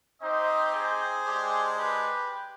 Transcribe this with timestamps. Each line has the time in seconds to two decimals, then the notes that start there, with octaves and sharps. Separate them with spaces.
0.21 C4 D#4 G4 C5 D#5
0.72 G#4 C5
1.25 G#3 D4 G4
1.76 G4 B4